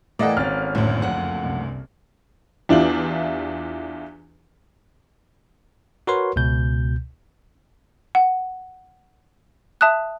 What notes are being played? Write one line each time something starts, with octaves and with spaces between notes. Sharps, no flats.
A2 E3 A#3 A4 D5 D#5 F#5 G5
G#1 C#4 F6 A6
F#1 D2 A2
F2 F#5
C2
E2 D4 E4 F4 G4 F#7
F#4 A#4 B4 C#5 C6
C#2 B2 G6
F#5
E5 A5 D#6 F#6